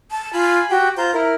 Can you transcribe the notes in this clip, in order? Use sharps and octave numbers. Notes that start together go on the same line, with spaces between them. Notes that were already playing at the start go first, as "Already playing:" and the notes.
A5
F4 G#5 B5
F#4 G4 G5
F4 C5 A#5 G6
E4 A#4